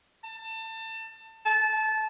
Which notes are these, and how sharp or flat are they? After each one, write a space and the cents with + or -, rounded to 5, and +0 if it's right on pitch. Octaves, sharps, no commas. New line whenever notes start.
A5 +25
A5 -20